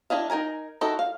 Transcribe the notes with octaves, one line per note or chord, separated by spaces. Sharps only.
D4 E4 D#5 F5
D#4 A#4 G#5 A#5
D#4 E4 F#4 A4 D#5
F5